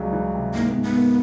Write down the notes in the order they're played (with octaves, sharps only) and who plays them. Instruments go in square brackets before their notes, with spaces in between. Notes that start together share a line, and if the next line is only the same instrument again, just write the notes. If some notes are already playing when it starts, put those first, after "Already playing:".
Already playing: [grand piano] C#2 F#3 G3
E3
C3
[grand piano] G#2 [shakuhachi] A#3
[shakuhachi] B3
[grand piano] G#2
[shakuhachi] B3
[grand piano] A#3